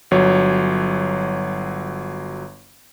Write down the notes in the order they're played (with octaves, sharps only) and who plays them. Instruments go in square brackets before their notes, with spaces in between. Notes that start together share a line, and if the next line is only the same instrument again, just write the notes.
[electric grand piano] G1 F#3 C#5